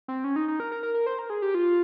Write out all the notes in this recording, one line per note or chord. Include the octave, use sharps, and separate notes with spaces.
C4
C#4
D#4
D#4
A#4
A#4
A#4
A#4
C5
A#4
G#4
G4
F4